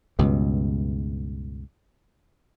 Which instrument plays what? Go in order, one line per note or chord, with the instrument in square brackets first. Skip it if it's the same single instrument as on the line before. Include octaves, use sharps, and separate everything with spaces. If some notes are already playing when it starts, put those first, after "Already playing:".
[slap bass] C#2 G2 B2